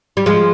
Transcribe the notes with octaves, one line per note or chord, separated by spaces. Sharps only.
G3
F3 G#3